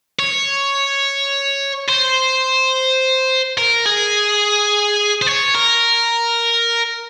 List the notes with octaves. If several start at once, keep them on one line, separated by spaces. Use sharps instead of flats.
C#5
C5
A#4
G#4
C5
C#5
A#4